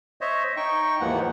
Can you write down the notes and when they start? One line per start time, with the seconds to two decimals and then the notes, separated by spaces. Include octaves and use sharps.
0.21 C5 C#5 D#5 E5
0.57 D#4 G5 C#6
1.01 D#2 G#2 E3 F3 A#3 F#5